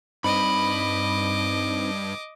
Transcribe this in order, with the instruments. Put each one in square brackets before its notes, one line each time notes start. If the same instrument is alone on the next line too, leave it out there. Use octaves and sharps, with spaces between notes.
[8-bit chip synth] G2 [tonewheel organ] C4 D#4 [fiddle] D#5 D6 [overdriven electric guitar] B5